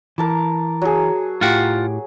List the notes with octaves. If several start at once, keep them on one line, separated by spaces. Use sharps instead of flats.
E3 A#4 A5 D6
F#3 G#4
A2 F4 G4 F#5